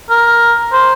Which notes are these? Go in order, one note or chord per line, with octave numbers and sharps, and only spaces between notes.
A#4
C5